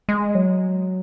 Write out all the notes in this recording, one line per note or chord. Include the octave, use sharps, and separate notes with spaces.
G#3
F#3